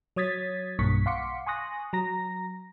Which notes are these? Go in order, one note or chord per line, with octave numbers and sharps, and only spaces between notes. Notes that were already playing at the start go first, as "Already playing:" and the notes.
F#3 C#5 D#6 G#6 A6 B6
B1 G2 A#3 C#6 B6
F5 F#5 C6 D6 B6 C#7
G#5 C6 C#6 D#6 F#6 A#6
F#3 A#5 A#6